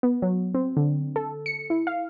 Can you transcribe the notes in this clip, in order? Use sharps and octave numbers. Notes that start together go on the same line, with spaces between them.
B3
F#3
C4
D3
A4
C#7
E4
F5